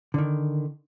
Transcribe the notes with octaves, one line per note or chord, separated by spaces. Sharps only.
D3 D#3